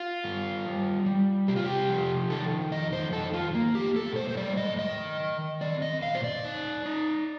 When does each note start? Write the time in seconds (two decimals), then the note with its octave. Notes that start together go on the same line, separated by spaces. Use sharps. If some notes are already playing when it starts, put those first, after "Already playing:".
Already playing: F4
0.24 G2
0.65 G3
1.06 G3
1.48 C3 G4
1.56 F4
1.65 G4
1.89 F3
2.30 D#3 A4
2.71 F2 D#5
2.93 C5
3.13 D#3 A4
3.34 F4
3.55 A#3
3.75 G4
3.96 A2 A4
4.16 C5
4.29 C5
4.37 G3 D5
4.57 D#5
4.78 D#3 D#5
5.20 D#3
5.61 C4 D5
5.82 D#5
6.02 A#2 F5
6.15 C5
6.24 D5
6.44 D#4
6.86 D#4